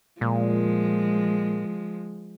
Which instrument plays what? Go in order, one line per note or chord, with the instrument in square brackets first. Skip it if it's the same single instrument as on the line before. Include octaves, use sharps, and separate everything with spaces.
[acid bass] A#2 [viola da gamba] F3 G#3